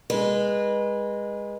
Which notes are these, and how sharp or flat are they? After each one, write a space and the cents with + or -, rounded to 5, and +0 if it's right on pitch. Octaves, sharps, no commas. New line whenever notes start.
G#3 -20 B4 -25